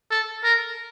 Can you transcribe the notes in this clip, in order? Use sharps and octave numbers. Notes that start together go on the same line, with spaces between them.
A4
A#4